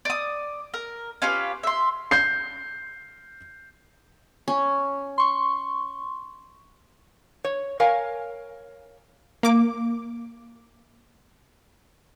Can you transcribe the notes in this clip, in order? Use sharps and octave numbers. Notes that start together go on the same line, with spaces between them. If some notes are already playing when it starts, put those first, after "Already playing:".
D5 D#6
A#4
C#4 F4 G4 B4
E5 C6
G6 C7
C#4
C6 C#6
C#5
A#4 C#5 F5 G#5
A#3 D6